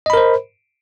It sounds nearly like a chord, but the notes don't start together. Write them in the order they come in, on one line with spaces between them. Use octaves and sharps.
D#5 B5 A#4 C5